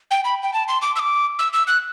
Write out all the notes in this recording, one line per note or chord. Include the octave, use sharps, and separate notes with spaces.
G5
B5
G5
A5
C6
D6
E6
D6
E6
E6
F#6